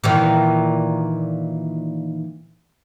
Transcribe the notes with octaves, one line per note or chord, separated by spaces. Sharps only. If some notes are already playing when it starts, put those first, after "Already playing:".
A#2 D#3 E3